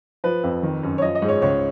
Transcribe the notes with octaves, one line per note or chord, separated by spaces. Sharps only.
F3 B4
F2
D#3
F#2
C#5
F3 D#5
D#5
G#2
C#5
C#2 C#5